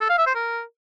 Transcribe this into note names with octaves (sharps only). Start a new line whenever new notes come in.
A4
F5
E5
C5
A#4